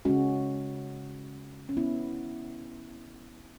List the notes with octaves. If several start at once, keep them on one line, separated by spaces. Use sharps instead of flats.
C#3 G#3 C#4 F#4
C#4
B3 E4